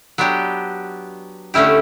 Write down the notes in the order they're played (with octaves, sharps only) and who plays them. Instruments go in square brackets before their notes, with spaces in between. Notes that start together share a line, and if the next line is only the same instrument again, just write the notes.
[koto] F#3 B3 D4 G4
D3 A3 C#4 E4 G4